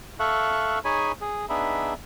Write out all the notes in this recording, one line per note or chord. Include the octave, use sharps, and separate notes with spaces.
A4 E5 F5 C#6 F#6
D#4 G#4 C#5 G#5 B5
G#4
B3 D4 D#4 G#4 E5 B5